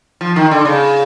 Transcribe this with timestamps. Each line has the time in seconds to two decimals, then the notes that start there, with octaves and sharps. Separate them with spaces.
0.21 F3
0.36 D#3
0.51 D3
0.65 C#3